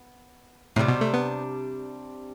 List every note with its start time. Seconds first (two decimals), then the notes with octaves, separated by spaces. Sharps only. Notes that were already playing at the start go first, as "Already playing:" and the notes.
Already playing: B3
0.76 A2 C3 G3 D4
0.88 B2
1.01 A3
1.14 B3